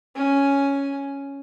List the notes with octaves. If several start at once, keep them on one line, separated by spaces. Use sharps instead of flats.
C#4 G#5